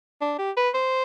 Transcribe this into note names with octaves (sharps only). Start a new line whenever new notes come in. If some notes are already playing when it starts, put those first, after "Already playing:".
D4
G4
B4
C5